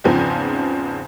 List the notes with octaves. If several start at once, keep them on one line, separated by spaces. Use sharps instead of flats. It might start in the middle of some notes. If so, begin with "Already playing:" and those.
E2 G#2 C#3 F3 C4